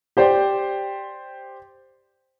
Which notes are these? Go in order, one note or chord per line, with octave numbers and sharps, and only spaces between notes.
G4 C5 D5 G5